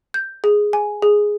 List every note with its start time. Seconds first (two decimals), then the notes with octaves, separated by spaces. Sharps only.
0.14 G6
0.44 G#4
0.73 G#5
1.02 G#4